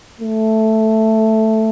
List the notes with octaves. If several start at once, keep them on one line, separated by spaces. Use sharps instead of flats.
A3